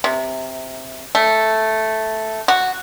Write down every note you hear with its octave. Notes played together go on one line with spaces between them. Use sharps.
C3
A3
F#4